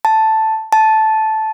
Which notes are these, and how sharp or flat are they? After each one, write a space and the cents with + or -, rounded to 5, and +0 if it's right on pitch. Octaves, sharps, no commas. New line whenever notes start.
A5 +0
A5 -10